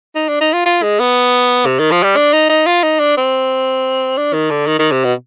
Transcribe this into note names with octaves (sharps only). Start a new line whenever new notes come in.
D#4
D4
D#4
F4
F4
G#3
B3
C3
D#3
F3
G3
D4
D#4
D#4
F4
D#4
D4
C4
D4
D#3
D3
D#3
D#3
C3
B2